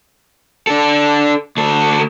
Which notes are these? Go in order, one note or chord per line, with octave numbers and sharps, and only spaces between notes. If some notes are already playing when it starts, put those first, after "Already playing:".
D4 A4
D2 A4